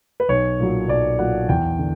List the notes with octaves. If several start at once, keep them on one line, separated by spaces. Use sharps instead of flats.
B4
B1 C#5
A#2 F#3
B1 D5
A#2 F#3 F#5
E2 G5
D3